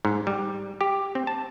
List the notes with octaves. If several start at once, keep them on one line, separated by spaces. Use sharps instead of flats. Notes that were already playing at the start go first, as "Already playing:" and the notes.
G#2
G3
G4
C4
A5